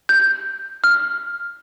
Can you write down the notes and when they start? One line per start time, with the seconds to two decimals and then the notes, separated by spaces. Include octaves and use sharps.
0.09 G6
0.84 F6